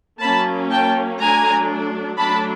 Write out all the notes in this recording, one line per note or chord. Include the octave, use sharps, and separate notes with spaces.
F#3 A#3 C#4 A5 B5
G5 A5
F#3 A3 D4 G#5 A#5
F#3 A3 D4 A5 B5